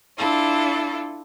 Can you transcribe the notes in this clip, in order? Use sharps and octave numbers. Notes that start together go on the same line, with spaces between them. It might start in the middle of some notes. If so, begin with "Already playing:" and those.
D4 E4 F4 A4